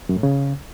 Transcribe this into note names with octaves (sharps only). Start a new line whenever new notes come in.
F#2
A2
C#3